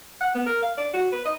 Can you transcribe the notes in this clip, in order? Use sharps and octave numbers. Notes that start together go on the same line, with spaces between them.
F#5
B3
A#4
F5
D5
F#4
B4
D#5